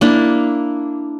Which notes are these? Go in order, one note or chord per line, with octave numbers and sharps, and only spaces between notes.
A#3 D4 E4